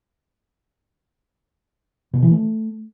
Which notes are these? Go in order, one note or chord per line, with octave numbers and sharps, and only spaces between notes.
B2
E3
A3